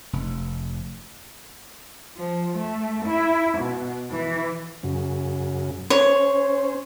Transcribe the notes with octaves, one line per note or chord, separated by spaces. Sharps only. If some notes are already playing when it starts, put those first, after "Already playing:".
F1
F3
A3
E4
B2
E3
F#2 C#3
C#4 C5 C#5